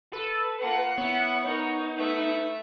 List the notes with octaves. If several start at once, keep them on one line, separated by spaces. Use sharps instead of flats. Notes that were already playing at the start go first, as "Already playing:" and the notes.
A4 B4
A#3 F4 F#5
B3 E4 C#5
D#4 A#4 C#5
A3 B4 E5